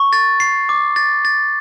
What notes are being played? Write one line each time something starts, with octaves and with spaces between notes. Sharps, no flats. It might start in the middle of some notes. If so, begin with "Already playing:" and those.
Already playing: C#6
A6
C7
D6
A6
A6